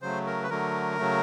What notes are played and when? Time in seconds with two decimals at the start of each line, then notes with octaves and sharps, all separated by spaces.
0.02 C#3 F#3 A3 C5
0.27 A#4
0.43 B4
0.50 D3 F#3 A3 A#4
0.98 C#3 F#3 A3